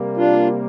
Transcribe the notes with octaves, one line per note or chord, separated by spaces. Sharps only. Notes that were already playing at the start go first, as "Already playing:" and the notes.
Already playing: C3 G3 A#3
D4 F4